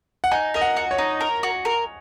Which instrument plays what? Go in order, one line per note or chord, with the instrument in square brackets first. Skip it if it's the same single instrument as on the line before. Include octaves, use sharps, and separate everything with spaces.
[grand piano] F#5
[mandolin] D#4 [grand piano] G#5
[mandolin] A#4 [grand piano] D#5
[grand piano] F#5
[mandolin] F#4
[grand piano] C#5
[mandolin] D#4
A#4
F#4
A#4